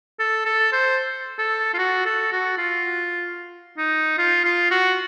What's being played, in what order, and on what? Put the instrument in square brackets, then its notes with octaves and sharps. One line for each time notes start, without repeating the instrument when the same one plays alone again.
[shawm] A4
A4
C5
A4
F4
F#4
A4
F#4
F4
D#4
F4
F4
F#4